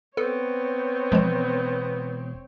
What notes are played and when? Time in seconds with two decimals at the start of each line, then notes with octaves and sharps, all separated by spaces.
0.17 B3 C4 A4 C#5
1.12 E1 F3 G#3 C5